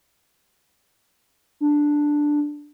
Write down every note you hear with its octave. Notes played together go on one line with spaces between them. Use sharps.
D4